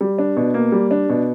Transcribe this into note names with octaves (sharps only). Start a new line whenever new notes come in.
G3
D4
B2
A#3
G3
D4
B2